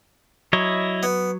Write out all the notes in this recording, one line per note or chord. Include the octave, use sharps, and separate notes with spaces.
F#3 E4 C#5 D#5
B3